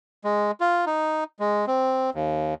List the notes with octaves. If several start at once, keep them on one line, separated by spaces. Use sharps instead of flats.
G#3
F4
D#4
G#3
C4
D#2